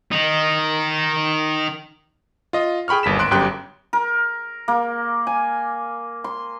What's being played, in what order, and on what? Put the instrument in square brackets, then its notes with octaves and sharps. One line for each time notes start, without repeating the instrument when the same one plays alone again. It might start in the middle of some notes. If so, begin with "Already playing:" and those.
[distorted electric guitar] D#3 D#4
[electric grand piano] F4 D#5
G#4 G5 B5 C#6 F6
G1 D#2 B6 E7
G#1 C6 F#6 D7
G1 F#2 G4 G5 C6 F#6
[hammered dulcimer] A#4
A#3
G#5
C6